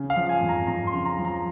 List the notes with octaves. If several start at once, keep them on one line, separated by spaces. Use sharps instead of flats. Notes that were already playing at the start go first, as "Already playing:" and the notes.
Already playing: C#3
F5
F3
G#5
F2
A#5
F2 A#5
C6
C#3
A#5
F3
A#5